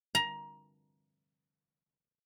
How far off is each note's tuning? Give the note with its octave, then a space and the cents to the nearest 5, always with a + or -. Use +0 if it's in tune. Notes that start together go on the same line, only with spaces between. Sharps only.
A#5 +20